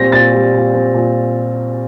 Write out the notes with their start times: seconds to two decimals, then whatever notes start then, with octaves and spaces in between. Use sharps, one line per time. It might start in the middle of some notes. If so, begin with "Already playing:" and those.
Already playing: A#2 G3 C4 A#6
0.12 A#2 A6
0.34 G3
0.54 A#2
0.74 C4
0.94 A#2